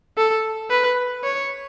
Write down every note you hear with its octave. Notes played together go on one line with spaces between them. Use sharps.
A4
B4
C#5